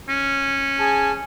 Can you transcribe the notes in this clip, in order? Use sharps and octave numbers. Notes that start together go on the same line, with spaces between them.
C#4
G#4 G#5 A5